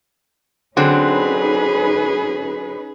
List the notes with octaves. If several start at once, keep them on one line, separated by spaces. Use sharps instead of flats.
D3 F#3 C4 C#4 D#4 G#4 B4